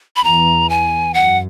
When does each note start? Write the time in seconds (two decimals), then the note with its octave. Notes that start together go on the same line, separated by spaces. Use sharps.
0.16 B5
0.24 E2 A#5
0.70 G#5
1.14 F#2 F#5